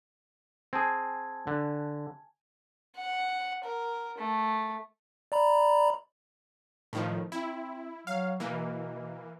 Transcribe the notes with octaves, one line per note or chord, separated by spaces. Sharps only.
C4 G#4 G#5 A5 G#6
D3
F#5
A#4
A3
D5 A#5 B5
A2 D#3 F3
C4 E4
F#3 F5
B2 E3 A#3